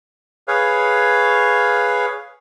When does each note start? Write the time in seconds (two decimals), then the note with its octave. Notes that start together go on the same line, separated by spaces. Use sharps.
0.48 G#4 B4 C#5 F5